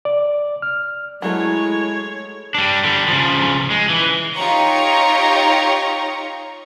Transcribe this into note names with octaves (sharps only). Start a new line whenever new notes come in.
D5
F6
F#3 G#3 A3 E4 C#5
G3 D4
D3 G3
C#3 F3
G#3
E3
D#4 F4 G4 C#5 A#5 C#6